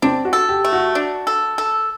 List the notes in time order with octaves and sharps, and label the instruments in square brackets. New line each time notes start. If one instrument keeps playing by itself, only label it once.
[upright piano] C4 [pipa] D4
[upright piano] F#4
[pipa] A4
[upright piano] G4
[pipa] A3
[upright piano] F#4
[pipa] D4
A4
A4